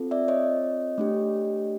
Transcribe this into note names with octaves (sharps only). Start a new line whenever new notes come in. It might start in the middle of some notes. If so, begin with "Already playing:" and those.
Already playing: C4 F4 A4
D5 E5
C#5 D#5
A3 D4 G4